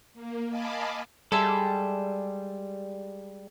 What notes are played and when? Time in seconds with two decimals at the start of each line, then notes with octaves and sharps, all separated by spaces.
0.14 A#3
0.50 D#5 F5 G#5 A5 B5 D6
1.32 G3 G#3 G#4 A4 E5